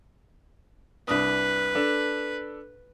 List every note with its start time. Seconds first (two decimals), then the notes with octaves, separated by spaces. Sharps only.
1.08 C2 D4 B4 D#6
1.75 D4 A4